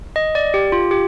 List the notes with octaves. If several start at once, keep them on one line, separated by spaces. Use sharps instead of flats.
D#5
D5
G4
F4
G4